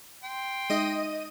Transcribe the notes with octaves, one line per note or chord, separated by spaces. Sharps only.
G5 C6
G#3 D#4 D#5 E5 D#7